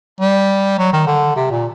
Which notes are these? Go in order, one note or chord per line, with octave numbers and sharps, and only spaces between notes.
G3
F#3
D#3
D3
C3
A#2